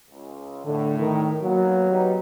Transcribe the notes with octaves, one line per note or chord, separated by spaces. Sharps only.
C#2
A2 D3
D#3
F#3 A#3 B3
G3 D#4 B4